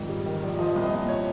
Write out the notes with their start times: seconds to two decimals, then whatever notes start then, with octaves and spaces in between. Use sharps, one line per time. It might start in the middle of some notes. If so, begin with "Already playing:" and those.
Already playing: A#1 F2 G#2 D#3
0.09 G3
0.26 D#3
0.43 A#1
0.59 F3 D#5
0.76 C2
0.83 D#5
0.92 A#2
1.09 C#5